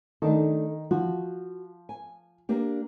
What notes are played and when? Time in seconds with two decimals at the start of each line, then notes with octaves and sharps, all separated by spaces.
0.22 D#3 A3 D4 A4
0.91 F3 F#4
1.89 G#5
2.49 A#3 D4 G4